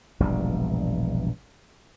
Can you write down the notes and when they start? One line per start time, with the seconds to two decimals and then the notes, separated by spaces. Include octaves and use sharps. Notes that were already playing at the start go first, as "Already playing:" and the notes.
0.20 E1 A#1 G2 G3